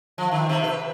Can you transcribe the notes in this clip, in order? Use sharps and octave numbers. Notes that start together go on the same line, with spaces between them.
F3
D#3
C3
B4